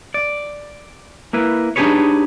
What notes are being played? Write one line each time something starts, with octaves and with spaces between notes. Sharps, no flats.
D5
A#3 E4 B4
D4 D#4 G4 G#4 B4 C#5